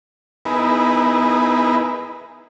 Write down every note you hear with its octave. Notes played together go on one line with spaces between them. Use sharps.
B3 D#4 E4 G#4 A#4 B4